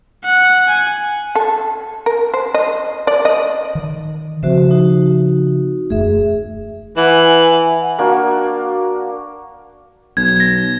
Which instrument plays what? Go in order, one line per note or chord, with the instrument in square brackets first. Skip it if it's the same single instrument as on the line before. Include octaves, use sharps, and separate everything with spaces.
[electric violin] F#5
G#5
[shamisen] A4
A#4
C5
D#5
D5
D#5
[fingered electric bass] D#3
[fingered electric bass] C#3 F3 C4 [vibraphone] F#4 C5 E5
[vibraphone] D#4 F#4
[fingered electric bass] E1 F#2 A3 [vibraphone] G#4 E5
[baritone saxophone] E3 [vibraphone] E5 F#5 G#5
[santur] A#3 D4 F#4
[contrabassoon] B1 [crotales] G#6
[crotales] A#6